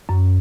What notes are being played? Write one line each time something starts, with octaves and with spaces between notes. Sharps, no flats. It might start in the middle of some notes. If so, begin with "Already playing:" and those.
F#2